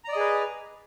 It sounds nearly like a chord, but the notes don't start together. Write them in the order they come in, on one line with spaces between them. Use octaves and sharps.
A#5 D5 D#5 G#4 B4